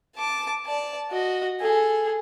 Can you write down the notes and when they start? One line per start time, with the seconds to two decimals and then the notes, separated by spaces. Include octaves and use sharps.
0.17 A5 D6
0.66 D5 A5
1.11 F#4 D#5
1.60 G#4 A4